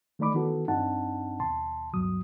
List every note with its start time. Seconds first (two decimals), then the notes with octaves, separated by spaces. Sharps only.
0.19 D#3 A3 D#4 D5 B5 D6
0.34 D#3 E3 B3 F#4 A4
0.68 G2 C4 D4 D#4 F#5 A5
1.40 D#2 B2 A5 C6
1.93 D2 G2 B2 F#3 D#6